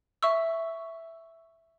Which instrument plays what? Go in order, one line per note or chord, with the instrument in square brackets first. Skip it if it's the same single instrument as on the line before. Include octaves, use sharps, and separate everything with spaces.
[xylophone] E5 C#6 E6